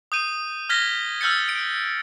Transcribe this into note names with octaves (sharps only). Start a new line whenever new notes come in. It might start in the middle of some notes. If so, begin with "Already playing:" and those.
D#6 G6 D#7
F6 G#6 A#6 B6 G7
E6 F6 G6 A6 C#7
D7